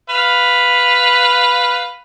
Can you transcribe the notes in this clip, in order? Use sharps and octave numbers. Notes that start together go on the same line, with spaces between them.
B4 F5